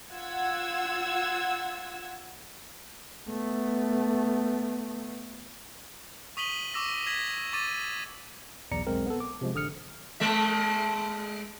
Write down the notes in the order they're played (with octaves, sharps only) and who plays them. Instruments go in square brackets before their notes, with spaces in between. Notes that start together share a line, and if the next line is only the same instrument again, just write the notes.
[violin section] F4 F#5 E6 G#6
[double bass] A3 B3
[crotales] C#6 D#6 B6 D#7 F#7 G7
C#6 D6 E6 A#6
G#6 A#6 B6 F#7
C#6 D6 A6 D#7
[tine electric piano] B1 E2 D5 A#5 C#7
B1 G#3 C4 A#4
B3 A4
D6
C3 F3 G#3
A1 D3 D#6 F6 C#7
[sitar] G#3 A3 E5